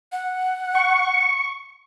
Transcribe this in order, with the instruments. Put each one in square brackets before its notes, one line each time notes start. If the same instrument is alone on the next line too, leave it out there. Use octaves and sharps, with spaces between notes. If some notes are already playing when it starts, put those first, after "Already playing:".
[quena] F#5
[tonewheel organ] C#6